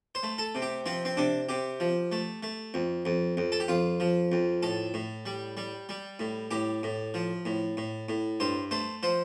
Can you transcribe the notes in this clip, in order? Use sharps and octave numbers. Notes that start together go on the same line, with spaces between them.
C5
A3
A4
C3
G4
F3 C4
C4
C3 D4
C3 G4
F3
A3
A3
F2
F2
F2
A4
G4
F2 F4
F3
F2
A2 A4
A2
G3
G3
G3
A2
A2 G4
A2
F3
A2
A2
A2
G2 C5
A3 C5
F3 C5